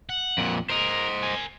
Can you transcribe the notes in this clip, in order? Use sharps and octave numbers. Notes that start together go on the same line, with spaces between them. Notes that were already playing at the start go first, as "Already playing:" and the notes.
F#5
F2 A#2
A#4 C5 D#5
A#4 G#5